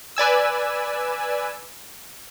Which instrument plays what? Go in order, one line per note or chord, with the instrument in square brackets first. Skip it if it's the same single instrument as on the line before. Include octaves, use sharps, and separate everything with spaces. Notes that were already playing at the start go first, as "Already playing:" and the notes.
[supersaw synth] B4 D5 G#5 E6